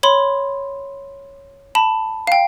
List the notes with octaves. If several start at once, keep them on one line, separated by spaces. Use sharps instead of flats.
C#5 B5 C6
A5 B5
F5 G5